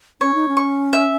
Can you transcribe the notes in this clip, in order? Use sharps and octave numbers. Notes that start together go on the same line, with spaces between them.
C#4 C#5
D#4
C#4
C#6
E5